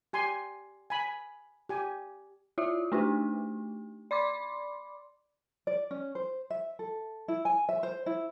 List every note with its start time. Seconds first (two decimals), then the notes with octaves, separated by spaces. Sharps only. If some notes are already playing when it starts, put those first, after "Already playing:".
0.13 G4 G#5 C6
0.90 G#5 B5
1.69 G4 G#5
2.58 E4 F4 E5
2.92 A3 D4 D#4 G4
4.11 D5 B5 C6 D6
5.67 D5
5.91 C#4
6.15 C5
6.50 E5
6.79 A4
7.28 E4
7.45 G#5
7.69 E5
7.83 C5
8.06 E4